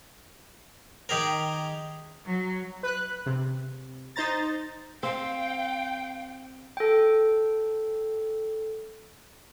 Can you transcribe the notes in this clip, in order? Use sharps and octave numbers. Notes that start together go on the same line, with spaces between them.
D#3 G4 G#4 A#4
F#3
B4 F#6
C3
D#4 C5 A#5 A6
C4 F5 G5
A4 G5